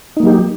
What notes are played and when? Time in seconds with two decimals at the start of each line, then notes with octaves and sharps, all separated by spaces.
0.17 D#4
0.20 A#3
0.23 F#3
0.27 G4